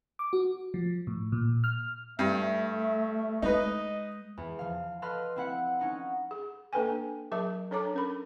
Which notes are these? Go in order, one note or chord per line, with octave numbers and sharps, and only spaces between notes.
D6
F#4
F3
A2
A#2
F6
G2 A3 E5
G#3 D#4 B4 D#5
E2
F3 F5
A4 B4 D#5 F5 C6 F6
C4 E4 F#5
C#4 D#4 F#5
G#4
A#3 D4 A4 B4 G5 G#5
F#3 G#4 A#4 E5 A5
D4 A4 C#5 A5 A#5 D6
C#4 A#4 B5